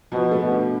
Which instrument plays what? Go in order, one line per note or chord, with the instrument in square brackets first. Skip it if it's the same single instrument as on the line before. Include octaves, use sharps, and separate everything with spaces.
[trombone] B2 [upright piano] F3
[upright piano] A3
[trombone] B2
[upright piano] G2